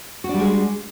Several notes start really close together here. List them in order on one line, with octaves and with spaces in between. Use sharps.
F#4 D4 G3 G#3